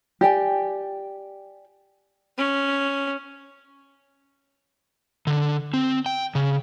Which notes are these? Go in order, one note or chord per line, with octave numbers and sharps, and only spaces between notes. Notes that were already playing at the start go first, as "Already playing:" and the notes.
G4 D5 G5 G#5
C#4
D3
C4
G5
C#3